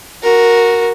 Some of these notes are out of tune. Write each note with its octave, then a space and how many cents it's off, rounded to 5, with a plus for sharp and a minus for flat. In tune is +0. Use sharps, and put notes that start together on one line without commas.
F#4 -10 A#4 +0